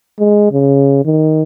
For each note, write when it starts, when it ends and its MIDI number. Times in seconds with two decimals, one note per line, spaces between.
0.19 0.47 56
0.52 1.03 49
1.05 1.43 51